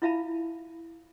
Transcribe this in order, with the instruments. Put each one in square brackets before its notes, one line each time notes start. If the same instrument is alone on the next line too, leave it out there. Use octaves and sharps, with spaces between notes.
[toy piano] E4 F4 E5 F5 A5 B5